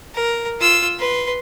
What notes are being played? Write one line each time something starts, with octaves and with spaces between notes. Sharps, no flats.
A#4
F4 E6
B4 C6